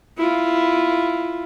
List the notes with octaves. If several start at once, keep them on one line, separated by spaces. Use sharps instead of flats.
E4 F4